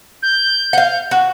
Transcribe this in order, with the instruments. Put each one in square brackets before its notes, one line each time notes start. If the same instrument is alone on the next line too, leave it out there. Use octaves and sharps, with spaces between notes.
[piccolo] G6
[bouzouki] F5 F#5
F#4